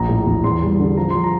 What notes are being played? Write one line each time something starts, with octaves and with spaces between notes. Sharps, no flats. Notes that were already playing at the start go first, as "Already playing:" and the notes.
Already playing: A#1 A#5
A2
A#1
E2 C6
G3
D3
F3 A#5
F3 C6
A#5